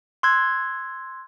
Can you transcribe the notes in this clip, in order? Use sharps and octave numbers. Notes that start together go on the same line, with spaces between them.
C6 E6 F#6 G#6